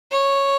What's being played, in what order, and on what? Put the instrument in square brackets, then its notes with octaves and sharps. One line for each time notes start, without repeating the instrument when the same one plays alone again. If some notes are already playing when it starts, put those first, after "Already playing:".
[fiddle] C#5